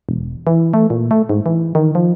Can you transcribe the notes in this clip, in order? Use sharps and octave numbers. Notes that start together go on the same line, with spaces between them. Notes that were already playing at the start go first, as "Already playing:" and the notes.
E1
E3
A3
A#2
A3
G#2
E3
D#3
F3